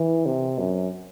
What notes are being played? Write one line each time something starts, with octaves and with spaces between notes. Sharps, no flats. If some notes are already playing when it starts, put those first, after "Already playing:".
Already playing: E3
C3
F#2